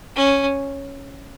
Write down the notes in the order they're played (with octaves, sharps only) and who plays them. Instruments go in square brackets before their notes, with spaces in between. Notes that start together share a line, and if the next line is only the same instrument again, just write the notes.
[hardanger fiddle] C#4